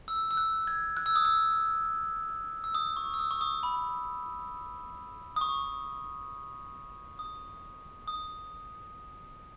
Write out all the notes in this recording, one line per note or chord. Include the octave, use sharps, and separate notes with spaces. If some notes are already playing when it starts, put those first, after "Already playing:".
E6
E6
F#6
G#6
F#6
E6
D#6
E6
E6
D#6
C#6
E6
D#6
C#6
D#6
B5
D#6
C#6
D#6
D#6